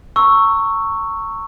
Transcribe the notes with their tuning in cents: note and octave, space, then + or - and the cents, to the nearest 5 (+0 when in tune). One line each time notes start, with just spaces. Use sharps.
A#5 -35 C#6 +0 E6 +0